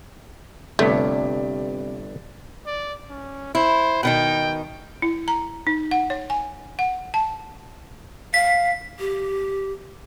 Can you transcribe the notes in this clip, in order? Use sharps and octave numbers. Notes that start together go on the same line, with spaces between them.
G1 G2 C3 A3 C#5 D5 B6
D5
C#4
E4 C5
B2 D#3 D#4 G5
E4
A#5
D#4
F#5
C#5
G#5
F#5
A5
F5 B6
G4